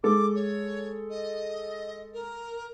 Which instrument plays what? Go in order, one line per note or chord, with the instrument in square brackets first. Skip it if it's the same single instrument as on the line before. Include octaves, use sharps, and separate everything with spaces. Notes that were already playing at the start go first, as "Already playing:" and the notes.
[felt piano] G#3 A4 [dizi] D6
[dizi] C#5
D#5
A#4